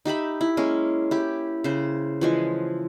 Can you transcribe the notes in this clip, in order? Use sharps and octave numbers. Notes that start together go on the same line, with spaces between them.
D#4 G4 E5 B5
E4
G#3 A#3 C#4
E4 G4
C#3 C5
E3 F3 G#3